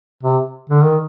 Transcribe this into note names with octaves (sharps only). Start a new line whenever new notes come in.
C3
D3
D#3